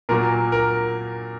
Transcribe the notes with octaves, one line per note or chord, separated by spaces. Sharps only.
A#2 F#3 A#3 A#4
A#4